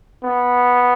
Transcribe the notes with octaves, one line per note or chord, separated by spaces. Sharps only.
B3